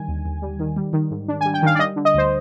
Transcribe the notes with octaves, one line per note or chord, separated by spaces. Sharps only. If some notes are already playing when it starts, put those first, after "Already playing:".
Already playing: D3 D#3 G3 G#5
D#2
D#2
G3
D#3
G3
D#3
G#2
D4
G#5
G3
G5
D#3 F5
D5
G3 D#5
D3
D#5
D2 C5